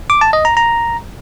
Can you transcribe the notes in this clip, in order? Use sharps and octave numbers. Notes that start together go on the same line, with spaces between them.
D6
A5
D#5
A#5
A#5